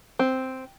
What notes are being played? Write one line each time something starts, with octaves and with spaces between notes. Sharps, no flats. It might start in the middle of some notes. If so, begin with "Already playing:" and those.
C4